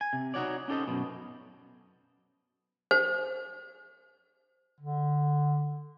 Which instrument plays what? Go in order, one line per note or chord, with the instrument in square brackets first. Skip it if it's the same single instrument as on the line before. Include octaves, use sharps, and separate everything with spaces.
[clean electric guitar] G#5
C3
D#4 F#4 C#5 D5
C#4 D#4 G4 A4 C5 D#5
F#2 B2
[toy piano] C5
[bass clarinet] D3